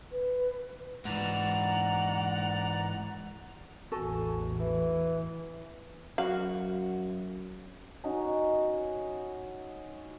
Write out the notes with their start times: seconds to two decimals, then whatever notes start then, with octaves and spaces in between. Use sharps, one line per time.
0.12 B4
1.05 G#2 E3 D5 F#5 A#5
3.92 A1 E2 F#4 A4 G#5
4.59 E3
6.18 F#2 F#4 F5
8.04 C#4 D#4 F#4